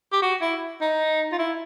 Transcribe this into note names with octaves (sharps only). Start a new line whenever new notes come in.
G4
F#4
E4
D#4
F4
E4